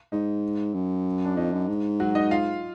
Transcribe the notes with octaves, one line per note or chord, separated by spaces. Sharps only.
G#2 D#4
F#2
D4
F2 D#4
F#2
G#2
F#3 F#4
D#4 D#5
F4 F5